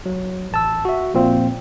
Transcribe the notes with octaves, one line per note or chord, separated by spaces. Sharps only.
F#3
A1 A5 E6
F#4 E5
A#2 F3 C4 F4